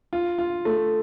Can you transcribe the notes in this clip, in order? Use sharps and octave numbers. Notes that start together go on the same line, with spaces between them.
F4
F4
A3